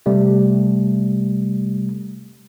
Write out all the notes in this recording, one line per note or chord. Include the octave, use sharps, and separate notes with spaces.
C3 G3 A3